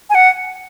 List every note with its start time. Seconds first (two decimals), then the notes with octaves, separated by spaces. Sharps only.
0.10 G#5
0.15 F#5